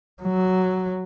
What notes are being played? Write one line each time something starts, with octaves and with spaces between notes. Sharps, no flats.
F#3